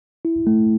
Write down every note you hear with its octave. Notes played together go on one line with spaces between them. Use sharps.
E4
A3